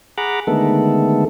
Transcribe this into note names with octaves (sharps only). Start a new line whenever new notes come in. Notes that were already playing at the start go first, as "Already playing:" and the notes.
G#4 F#5 A#5 B5 D6
D3 D#3 G#3 A3 B3 A4